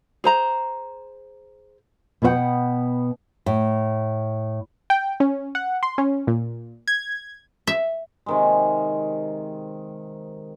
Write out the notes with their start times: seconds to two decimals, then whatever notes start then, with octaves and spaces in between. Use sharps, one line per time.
0.24 G#4 C5 A#5
2.22 B2 B3 G#4 C5 F#5 G5
3.46 A2
4.90 G5
5.20 C#4
5.55 F#5
5.83 C6
5.98 C#4
6.27 A#2
6.88 G#6
7.67 E5
8.26 C3 D#3 G#3